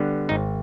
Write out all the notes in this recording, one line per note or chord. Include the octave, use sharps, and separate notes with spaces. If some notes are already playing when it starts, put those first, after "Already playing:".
Already playing: D3 G3 B3
G#1 D#4